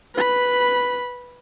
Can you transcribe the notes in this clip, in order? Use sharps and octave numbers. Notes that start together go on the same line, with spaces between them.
B4 B5